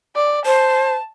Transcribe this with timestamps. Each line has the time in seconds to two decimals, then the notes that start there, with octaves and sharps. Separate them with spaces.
0.16 D5
0.46 C5 A5